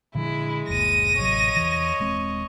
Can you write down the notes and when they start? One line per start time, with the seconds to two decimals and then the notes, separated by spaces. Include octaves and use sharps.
0.15 A#2 D3 F3 G#3 E4
0.68 F#1 D2 A#2 A#6 D#7
1.16 A1 C3 F#3 C#5 D#5
1.57 E2 E3
2.00 D#1 G#3 C4